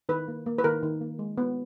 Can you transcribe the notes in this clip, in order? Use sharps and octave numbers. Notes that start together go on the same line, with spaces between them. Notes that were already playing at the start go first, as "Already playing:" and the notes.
D#3 B4
A#3
A#3
B4
D#3 A#4
D#3
A#3
G#3
B3